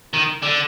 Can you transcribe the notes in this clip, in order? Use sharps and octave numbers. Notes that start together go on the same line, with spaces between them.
D#3
D3